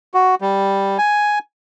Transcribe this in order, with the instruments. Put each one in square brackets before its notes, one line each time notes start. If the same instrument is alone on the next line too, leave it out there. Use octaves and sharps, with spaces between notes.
[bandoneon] F#4
G3
G#5